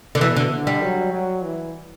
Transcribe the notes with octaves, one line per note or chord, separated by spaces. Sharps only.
D3
B2 E3
D3
D3
G3
F#3
F#3
E3